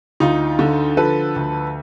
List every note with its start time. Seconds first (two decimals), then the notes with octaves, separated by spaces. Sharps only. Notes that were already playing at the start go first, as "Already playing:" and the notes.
0.20 D2 D#4 F4
0.59 D3
0.97 F3 A4 B4
1.36 D2